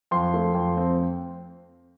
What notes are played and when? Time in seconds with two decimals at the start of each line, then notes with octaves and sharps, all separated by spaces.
0.11 F2 C6
0.34 A3
0.55 F2
0.77 C4
0.99 C4